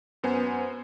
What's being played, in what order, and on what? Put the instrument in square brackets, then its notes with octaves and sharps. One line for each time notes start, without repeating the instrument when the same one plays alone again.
[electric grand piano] F#2 B3 C5 G#5